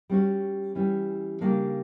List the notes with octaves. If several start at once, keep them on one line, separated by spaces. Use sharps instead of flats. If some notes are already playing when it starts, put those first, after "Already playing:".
G3 C#4 F#4 C#5
E3 G3 C#4
C#3 G3 A#3 D4